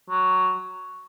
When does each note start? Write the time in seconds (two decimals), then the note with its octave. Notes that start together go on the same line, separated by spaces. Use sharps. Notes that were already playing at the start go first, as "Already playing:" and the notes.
0.10 F#3